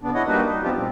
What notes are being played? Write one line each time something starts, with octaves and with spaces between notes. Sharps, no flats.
C#3 B3 D4
E4 C#5 D#5 F#5
G3 A#3 D4 D#4 F#4 B4
D#4
F3 B3 C4 D4 F4 G4
A#2 G3 C4